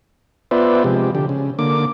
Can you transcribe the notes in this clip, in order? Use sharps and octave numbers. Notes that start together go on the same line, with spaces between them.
B3 F4 B4 C5 D5 E5
C3 F3 G#3 G4
D3 G4
C#3
D3 A#3 D6